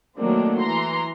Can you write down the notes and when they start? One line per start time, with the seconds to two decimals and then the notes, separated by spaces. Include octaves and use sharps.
0.18 D#3 F#3 A3 A#3 C4 D4
0.59 E3 A#5 C6